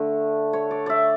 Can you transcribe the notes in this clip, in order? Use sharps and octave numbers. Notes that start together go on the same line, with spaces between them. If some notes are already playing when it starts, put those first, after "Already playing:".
Already playing: D3 A3
C#5
D5
D5 E5